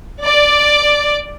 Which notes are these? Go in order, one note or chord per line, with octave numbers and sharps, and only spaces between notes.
D5